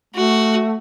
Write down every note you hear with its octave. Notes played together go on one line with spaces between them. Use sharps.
A3 F#4